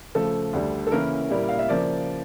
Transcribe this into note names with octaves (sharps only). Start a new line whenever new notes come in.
C#3 F3 A3 A4
D2 D3 G3
A4
C#3 E3 A#3 C#4 E4 A#4
A#2 G3 A#3 E4
F5
E5
C#3 F3 A#3 D5